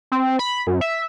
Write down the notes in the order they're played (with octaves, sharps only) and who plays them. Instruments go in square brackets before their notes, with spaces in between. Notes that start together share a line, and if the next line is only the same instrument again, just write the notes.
[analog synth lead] C4
B5
F#2
E5